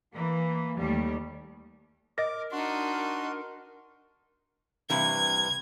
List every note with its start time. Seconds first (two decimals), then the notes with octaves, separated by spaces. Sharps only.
0.14 E3 A#3
0.77 D#2 G3 A3
2.18 A#4 D#5 D6 A6 A#6
2.52 D4 D#4 F#4 C6
4.90 G2 C3 E3 G#6